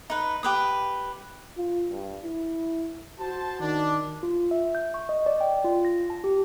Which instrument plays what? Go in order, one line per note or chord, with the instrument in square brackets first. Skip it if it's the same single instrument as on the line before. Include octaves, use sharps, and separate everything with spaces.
[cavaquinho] D#4 B4
G4 B4 D#6
[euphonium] F4
G2
E4
[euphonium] F#4 [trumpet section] C5 A5
[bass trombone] D#3 [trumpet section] D4
[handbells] F4
E5
G6
C#6
D#5
D5
G5
F4
A#6
A5
G4